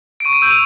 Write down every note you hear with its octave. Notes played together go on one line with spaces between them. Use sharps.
D7
C#6 D#7
D7
E6 G6 D#7
F7